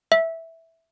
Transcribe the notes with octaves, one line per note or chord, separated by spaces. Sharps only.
E5